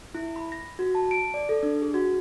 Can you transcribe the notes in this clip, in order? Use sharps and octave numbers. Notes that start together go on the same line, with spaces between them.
E4
B5
A#6
F#4
A5
D7
D5
A4
D4
G#4
F#4